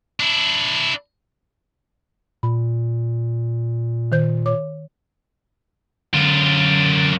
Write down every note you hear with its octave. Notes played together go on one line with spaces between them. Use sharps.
D4 E4
A#2 B5
D#3 C5 G6
C#5 D6
F#2 D3 F4